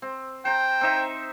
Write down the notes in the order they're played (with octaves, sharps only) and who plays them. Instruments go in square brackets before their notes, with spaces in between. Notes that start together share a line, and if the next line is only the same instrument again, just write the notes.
[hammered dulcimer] C4
[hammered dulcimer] C5 A#5 [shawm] G5
[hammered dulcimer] C4 D#4 E5